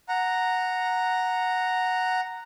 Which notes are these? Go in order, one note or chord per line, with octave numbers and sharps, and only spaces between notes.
F#5 A#5